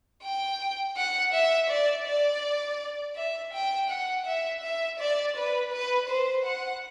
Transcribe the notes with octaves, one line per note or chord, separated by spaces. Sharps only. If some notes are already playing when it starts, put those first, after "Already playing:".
G5
F#5
E5
D5
D5
E5
G5
F#5
E5
E5
D5
B4
B4
C5
F#5